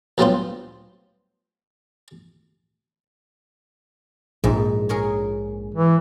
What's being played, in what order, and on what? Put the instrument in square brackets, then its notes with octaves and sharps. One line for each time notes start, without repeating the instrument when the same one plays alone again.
[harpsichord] D2 F#3 G3 B3 F4 C5
[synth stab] A#1 [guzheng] G#2
[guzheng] G#4 A#4 C#5
[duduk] E3